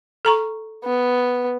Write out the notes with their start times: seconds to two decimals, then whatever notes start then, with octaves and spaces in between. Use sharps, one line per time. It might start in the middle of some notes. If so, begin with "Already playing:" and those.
0.25 A4 A#5 C#6
0.84 B3